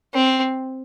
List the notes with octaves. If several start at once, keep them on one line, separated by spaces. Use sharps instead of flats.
C4